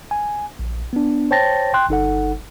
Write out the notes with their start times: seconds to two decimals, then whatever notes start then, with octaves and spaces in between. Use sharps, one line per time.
0.11 G#5
0.59 A#1
0.93 B3 D4
1.31 C5 C#5 G5 A5 A6 A#6
1.74 G5 C6 F#6
1.89 G1 D#4 A4 F#5